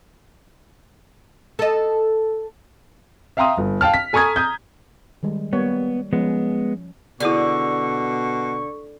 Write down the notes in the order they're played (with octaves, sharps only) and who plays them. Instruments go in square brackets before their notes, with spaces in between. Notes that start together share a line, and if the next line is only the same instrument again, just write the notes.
[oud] A4 D#5
[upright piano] E5 F5 G5 A#5 C6 D#6
G1
F5 G5 A5 F6
B6
A4 G#5 A#5 C#6 D#6 G#6
A#5 D#6 G6
[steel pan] D#3 G3 G#3
[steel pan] G3 A#3 C#5 [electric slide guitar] B3
[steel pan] F3 C#4 [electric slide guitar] G#3 B3
[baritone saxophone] B2 [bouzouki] D3 [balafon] E4 G#4 D5 [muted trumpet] C#6